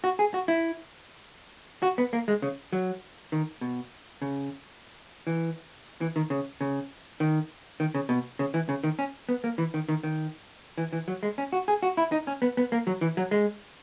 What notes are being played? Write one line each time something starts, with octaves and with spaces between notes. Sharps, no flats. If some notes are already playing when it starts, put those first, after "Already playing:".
F#4
G#4
F#4
E4
F#4
B3
A#3
G#3
C#3
F#3
D#3
B2
C#3
E3
E3
D#3
C#3
C#3
D#3
D#3
C#3
B2
C#3
E3
C#3
D#3
C#4
B3
A#3
E3
D#3
D#3
D#3
E3
E3
F#3
G#3
C#4
F#4
G#4
F#4
E4
D#4
C#4
B3
B3
A#3
F#3
E3
F#3
G#3